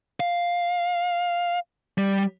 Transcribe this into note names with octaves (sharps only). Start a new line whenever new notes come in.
F5
G3